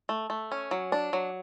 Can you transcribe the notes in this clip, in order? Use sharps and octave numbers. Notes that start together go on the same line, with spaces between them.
A3
A3
C#4
F#3
D4
F#3